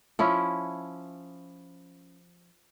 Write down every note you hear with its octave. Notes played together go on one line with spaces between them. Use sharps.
F3 C#4 E4